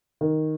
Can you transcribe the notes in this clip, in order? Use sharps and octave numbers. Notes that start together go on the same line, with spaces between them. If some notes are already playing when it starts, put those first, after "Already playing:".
D#3